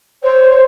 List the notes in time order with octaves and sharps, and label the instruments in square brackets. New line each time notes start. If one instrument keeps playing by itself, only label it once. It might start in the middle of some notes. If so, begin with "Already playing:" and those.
[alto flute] C5 [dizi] C#5